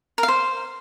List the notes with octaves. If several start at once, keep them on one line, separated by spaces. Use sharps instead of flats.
A#4
F5
C5